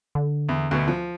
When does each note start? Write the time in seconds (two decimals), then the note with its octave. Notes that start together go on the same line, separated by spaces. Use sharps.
0.15 D3
0.49 E2
0.71 D2 B2 B3
0.88 F3